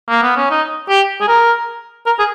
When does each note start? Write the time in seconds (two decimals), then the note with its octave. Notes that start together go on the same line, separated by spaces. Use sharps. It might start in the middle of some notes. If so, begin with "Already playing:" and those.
0.09 A#3
0.23 B3
0.37 C#4
0.51 D#4
0.89 G4
1.21 G#4
1.28 A#4
2.06 A#4
2.19 G#4